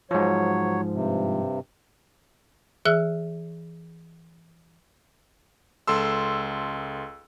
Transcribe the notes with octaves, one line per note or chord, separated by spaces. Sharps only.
G#2 F3 F#3 C#5
G2 C3
E3 G#4 E5 E6 F#6
C#2 A4 C6 E6